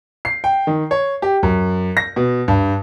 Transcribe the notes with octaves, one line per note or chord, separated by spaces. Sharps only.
C7
G5
D#3
C#5
G4
F#2
A#6
B2
G2